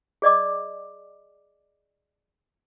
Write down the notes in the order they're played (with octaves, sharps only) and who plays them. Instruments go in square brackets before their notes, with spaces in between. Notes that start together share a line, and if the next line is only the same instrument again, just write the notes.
[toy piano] G#4 D5 D#5 D6